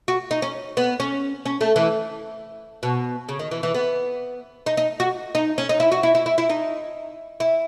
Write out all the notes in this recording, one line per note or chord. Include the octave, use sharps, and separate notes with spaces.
F#4
D#4
C#4
B3
C#4
C#4
A3
E3
B2
C#3
D#3
E3
E3
B3
D#4
D#4
F#4
D#4
C#4
D#4
E4
F#4
E4
E4
E4
E4
D#4
E4